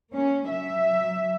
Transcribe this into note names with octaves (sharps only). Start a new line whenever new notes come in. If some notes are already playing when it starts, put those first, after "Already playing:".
A#3 C#4
F#3 E5